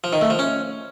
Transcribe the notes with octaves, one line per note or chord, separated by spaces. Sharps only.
F3
D#3
A3
F3
C#4